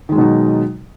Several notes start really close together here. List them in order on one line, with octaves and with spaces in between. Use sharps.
D#3 G#3 F#3 B2 D#4